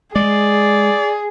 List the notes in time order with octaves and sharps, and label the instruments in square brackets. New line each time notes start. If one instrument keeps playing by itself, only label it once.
[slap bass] G#3 [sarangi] G#4 [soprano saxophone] D5